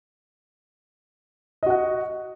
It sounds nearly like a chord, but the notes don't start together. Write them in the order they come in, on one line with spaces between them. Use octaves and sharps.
D#5 F#4 F#5